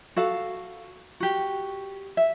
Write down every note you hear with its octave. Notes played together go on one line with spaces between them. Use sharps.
F#4 A4 F5
F#4 G4
E5